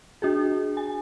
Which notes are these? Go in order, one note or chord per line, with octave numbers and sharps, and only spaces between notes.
D4 F#4 G#4
G#5